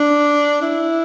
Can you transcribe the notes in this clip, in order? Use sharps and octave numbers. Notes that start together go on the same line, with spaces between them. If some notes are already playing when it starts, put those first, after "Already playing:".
Already playing: D4
E4